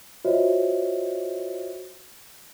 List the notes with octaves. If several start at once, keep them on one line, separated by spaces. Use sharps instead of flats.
F4 F#4 C5 C#5 D#5 E5